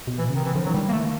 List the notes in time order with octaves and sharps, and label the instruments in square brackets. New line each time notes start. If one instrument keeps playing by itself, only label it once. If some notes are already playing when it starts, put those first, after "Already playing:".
[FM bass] B2
[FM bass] A#2 [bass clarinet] E3
[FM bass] C#3
[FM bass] C3 [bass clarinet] D#3
[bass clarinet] E3
[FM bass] D3 [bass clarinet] F3
[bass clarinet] F#3
[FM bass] E3
[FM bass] D#3 [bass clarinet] G3
[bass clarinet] A#3
A3